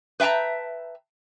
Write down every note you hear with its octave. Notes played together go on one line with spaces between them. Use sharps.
B4 E5 G5 A5 A#5